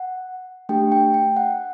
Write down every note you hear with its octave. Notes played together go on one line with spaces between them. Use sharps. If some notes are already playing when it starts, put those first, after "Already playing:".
Already playing: F#5
A3 D4 G4 G5
G5
G5
F#5